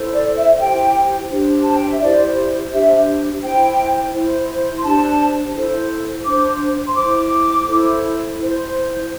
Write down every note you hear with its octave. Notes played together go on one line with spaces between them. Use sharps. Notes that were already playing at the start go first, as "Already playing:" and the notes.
Already playing: E4 A4 C5
D5
E5
E5
E4 G4 C5 G5
D4 G4 C5
A5
G5
E5
E4 G4 C5 D5
D4 G4 C5 E5
E4 C5 G5
E4 C5
C6
D4 G4 C5 A5
E4 A4 C5
D4 C5 D6
C6
E4 C5 D6
E4 A4 C5
E4 C5